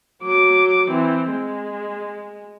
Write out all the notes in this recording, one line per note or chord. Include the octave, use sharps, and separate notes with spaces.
F#3 D6
E3 C4
G#3